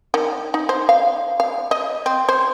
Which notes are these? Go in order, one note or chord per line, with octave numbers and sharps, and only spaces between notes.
D#3
D#4
C5
F5
F5
D#5
C4
C5